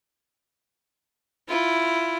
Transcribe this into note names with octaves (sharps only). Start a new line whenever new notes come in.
E4 F4